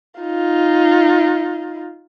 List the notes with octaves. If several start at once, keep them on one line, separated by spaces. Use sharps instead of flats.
D#4 F4